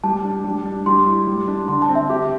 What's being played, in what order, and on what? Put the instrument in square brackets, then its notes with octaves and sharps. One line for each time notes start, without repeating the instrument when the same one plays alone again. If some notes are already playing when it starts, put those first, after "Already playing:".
[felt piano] G3 [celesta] A5
[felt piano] D4
G3
D4
[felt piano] G3 [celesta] C6
[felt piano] E4
G3
D4
[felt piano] D3 [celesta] C6
[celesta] A5
[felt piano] C4
[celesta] E5
[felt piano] G4